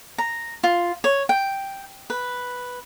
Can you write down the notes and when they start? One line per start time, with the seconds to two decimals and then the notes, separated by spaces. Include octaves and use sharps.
0.18 A#5
0.63 F4
1.04 C#5
1.29 G5
2.10 B4